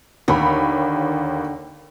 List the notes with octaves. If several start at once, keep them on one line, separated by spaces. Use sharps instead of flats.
D#2 D3 B5